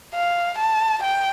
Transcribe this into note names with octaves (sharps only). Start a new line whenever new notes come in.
F5
A5
G5